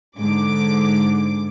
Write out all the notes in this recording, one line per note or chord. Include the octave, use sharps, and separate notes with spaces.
G#2 D3 D6